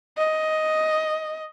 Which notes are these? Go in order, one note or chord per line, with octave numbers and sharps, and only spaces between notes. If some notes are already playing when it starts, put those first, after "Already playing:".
D#5